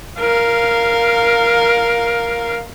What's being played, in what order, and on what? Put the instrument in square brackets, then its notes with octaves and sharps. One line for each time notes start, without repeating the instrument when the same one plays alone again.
[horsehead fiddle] A#4 F5